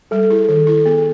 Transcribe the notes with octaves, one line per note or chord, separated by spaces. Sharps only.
G3 A4
E4 G#4
D#3 A4
E4 A4
B3 G#4